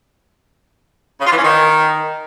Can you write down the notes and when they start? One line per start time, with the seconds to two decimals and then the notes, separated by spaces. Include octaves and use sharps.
1.21 C#3
1.26 F4
1.32 E3
1.38 C#4
1.44 D#3